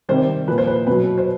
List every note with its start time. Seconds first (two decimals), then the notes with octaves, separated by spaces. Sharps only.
0.09 C3 D#3 G3 C5
0.48 A#2 F3 B4
0.58 C5
0.67 B4
0.87 B2 F#3 B4
1.18 C5